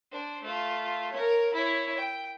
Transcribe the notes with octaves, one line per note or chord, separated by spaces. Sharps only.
D4 C5
A3 F4
A#4 C#5
E4 C#5
G5